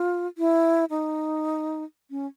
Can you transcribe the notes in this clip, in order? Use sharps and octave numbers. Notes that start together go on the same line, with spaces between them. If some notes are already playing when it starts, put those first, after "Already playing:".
Already playing: F4
E4
D#4
C#4